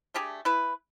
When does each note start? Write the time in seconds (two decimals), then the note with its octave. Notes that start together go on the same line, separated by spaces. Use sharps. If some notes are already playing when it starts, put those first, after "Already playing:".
0.14 A3 D4 G4 G#4
0.45 E4 B4